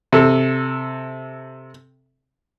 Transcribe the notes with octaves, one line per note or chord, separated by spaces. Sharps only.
C3 A4